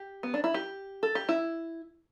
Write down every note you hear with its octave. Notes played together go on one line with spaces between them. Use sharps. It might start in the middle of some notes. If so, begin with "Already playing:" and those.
Already playing: G4
B3
D4
E4
G4
A4
G4
E4